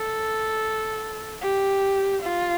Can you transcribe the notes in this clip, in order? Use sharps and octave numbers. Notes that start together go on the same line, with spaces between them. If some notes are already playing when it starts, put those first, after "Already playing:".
Already playing: A4
G4
F4